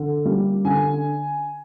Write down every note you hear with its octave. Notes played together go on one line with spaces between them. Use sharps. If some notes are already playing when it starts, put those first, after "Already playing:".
Already playing: D3
G3 A#3
D3 G#5